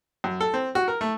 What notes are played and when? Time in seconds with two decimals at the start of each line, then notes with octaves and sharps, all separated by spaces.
0.24 F#2
0.41 A4
0.54 C4
0.75 F#4
0.88 A#4
1.01 A3